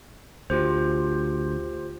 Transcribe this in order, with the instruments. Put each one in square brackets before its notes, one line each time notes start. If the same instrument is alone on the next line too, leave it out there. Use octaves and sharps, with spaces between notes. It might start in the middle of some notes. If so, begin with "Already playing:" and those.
[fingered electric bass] D2 [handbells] F4 G4 C5